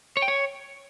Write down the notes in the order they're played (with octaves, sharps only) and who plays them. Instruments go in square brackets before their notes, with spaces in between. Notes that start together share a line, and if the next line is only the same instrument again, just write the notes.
[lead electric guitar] C#5
G5
C#5